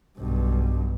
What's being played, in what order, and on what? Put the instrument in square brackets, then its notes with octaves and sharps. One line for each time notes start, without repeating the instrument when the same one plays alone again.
[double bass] B1 G2